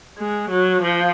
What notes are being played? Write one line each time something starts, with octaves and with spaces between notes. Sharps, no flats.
G#3
F#3
F3